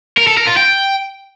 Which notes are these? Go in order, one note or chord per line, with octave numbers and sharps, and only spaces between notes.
A#4
A4
A#4
F4
G5